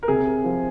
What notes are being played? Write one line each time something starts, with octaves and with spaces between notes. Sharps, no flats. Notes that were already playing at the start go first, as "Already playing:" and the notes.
A#4
C3 G#4
F3